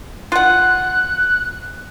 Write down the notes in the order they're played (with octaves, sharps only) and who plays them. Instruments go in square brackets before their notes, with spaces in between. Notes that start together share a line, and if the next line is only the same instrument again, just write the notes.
[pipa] F4 F#5 [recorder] F#6